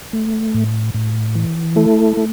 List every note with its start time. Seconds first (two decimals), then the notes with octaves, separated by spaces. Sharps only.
0.13 A3
0.54 A2
0.94 A2
1.35 E3
1.76 A3 E4 A4
2.17 A3